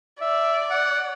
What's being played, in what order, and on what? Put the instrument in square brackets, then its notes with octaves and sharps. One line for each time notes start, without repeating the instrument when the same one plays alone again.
[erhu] D5 [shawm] E5
[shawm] F#5